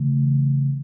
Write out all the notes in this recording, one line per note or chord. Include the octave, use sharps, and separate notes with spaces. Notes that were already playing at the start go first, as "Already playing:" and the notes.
Already playing: C#3 E3 A3